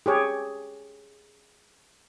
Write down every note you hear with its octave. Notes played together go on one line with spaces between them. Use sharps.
G4 G#4 C#5